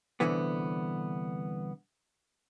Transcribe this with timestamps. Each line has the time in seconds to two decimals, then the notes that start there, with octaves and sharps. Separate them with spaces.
0.20 C2 B2 D3 E3 B3